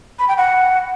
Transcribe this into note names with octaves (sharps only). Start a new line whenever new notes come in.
B5
G5
F#5